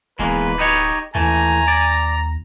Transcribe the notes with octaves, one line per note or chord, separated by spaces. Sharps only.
D1 E2 G#3 A#3 B4
D#4 G4 C#5 D#5
D#2 E3 A3 G#5 A#5
D5